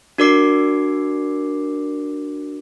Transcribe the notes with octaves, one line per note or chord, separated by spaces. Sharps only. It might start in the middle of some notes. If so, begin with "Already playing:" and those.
D4 F#4 A#4 D5 D6 C7